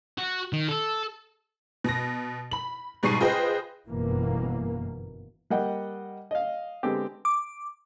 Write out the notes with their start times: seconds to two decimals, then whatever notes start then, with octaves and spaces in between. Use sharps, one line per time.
0.18 F#4
0.53 D#3
0.69 A4
1.84 B2 A#6
2.51 B5 F#7
3.03 G#2 B2 G3 C#6 C7 D#7
3.21 F4 G#4 B4 C5 D#5 G5
3.87 G1 F#2 B2 E3 A#3
5.50 G3 A#3 D#5 F#5 G5
6.31 D#5 F5
6.83 D3 G#3 B3 C4 G4
7.25 D6